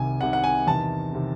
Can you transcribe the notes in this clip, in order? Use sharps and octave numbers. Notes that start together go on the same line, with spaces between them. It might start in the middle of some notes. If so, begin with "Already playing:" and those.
Already playing: C2 C3 D#3 G#5
C2 C3 D#3 F#5
F#5
G#5
E2 C3 D#3 A5
C3 D#3